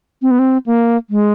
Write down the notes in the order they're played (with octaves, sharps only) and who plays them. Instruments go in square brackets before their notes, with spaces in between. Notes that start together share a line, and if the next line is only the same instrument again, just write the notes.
[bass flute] C4
B3
C4
A#3
G#3